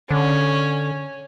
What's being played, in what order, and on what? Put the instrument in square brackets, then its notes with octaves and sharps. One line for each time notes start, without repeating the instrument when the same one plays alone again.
[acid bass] D3 [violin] C#4